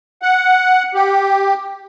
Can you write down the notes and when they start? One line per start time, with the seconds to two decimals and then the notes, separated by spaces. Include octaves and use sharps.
0.22 F#5
0.94 G4